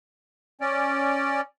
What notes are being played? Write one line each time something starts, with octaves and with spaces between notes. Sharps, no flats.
C#4 D5